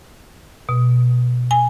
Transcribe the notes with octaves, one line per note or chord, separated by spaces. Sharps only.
B2
G#5